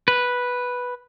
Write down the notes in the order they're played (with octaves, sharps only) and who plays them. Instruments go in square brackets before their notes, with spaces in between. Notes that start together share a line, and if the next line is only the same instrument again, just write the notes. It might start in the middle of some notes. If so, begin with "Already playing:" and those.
[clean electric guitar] B4